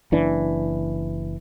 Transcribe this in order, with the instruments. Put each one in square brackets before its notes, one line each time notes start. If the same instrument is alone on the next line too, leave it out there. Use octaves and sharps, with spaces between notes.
[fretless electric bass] F#1 E3 D4